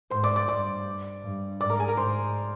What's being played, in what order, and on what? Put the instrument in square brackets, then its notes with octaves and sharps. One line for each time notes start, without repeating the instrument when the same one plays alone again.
[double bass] G#2 [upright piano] C5 C6
[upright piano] D5 D6
D5 D6
[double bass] G2 [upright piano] D5 D6
[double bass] G2
[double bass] G#2 [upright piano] D5 D6
[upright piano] A#4 A#5
G#4 G#5
A#4 A#5
[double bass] G#2 [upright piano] C5 C6